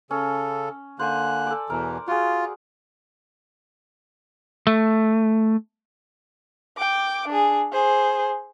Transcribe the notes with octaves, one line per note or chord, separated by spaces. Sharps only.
C#3 C#4 A4
D3 A#3 C5 G#5 F#6
A4 D5
E2 B2 E3 A#4
F4 F#4 G#4
A3
G5 D6
D4 G#4
G#4 C5